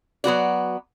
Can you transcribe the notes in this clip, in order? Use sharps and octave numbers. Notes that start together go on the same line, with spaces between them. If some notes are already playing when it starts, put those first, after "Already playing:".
F#3 B3 F#4 D5